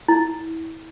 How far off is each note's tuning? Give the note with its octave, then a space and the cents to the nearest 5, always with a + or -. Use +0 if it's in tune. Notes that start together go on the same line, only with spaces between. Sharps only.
E4 -25